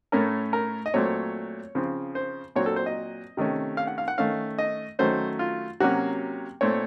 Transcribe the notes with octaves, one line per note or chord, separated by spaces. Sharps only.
A2 A3 C#4 A#4
A#4
D#5
A#2 F#3 A3 C4 C#5
C#3 F3 C4
C5
A#2 F#3 C4 C#5
A4
C5
D#5
C3 D#3 A3 C#4
F5
F#5
F5
F#5
D#3 A3 C#4 F5
D#5
D#3 F#3 A3 C#4 C5
F4
C3 F#3 A#3 C#4 F#4
A#2 A3 C4 C#5